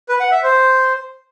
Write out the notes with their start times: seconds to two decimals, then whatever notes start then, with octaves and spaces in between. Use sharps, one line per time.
0.09 B4
0.20 F#5
0.32 E5
0.43 C5